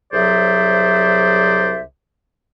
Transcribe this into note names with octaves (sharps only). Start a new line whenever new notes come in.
C2 F#3 G#4 C5 D5 E5